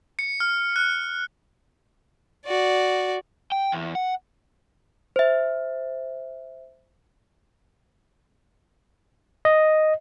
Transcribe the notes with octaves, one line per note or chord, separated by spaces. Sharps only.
C#7
F6
F#6
F#4 D5
G5
E2
F#5
C5 E5
D#5